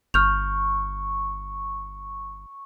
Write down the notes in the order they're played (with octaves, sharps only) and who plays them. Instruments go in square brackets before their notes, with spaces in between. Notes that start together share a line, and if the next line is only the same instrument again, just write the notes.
[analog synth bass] G1 [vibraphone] C#6 [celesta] F6 G6 F7